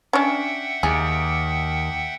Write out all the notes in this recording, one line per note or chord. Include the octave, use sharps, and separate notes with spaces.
C#4 D4 E5 F#5 G5
D#2 G#4